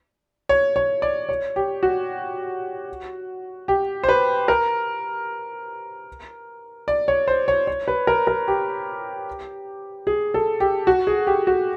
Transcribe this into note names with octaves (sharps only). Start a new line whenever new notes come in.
C#5
C#5
D5
C#5
G4
F#4
G4
C5
B4
A#4
D5
C#5
C5
C#5
C#5
B4
A#4
A#4
G4
G#4
A4
G4
F#4
G#4
G4
F#4